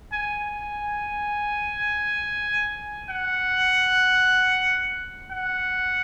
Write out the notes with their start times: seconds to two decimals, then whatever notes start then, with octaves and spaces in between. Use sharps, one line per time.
0.13 G#5
3.09 F#5
5.31 F#5